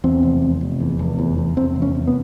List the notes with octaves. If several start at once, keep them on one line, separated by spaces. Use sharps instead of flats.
E2 C4
F1
F1
F1
E2
F1
E2
E2
E2 C4
F1
C#4
F1
B3